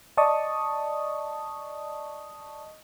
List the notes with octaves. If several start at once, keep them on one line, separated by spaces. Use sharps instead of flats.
D5 D#5 A5 C#6 D#6